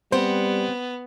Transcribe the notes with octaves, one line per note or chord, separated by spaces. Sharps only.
G3 B3 C4 C5 F#5